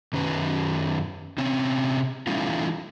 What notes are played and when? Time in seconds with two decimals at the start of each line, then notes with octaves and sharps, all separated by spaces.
0.13 F#2 D#3 C#4 B4
1.38 C3 C4 C#4
2.27 E3 G3 A3 C#4 D#4 F4